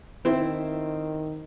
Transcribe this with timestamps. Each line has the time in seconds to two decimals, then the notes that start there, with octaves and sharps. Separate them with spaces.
0.25 D#3 C4 E4